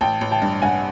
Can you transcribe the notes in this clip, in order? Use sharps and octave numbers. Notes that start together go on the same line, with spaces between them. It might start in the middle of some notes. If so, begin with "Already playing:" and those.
A1 G5 A5
A1
G5 A5
G2
G2 F#5 G#5